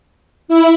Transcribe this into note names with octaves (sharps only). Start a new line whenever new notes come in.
E4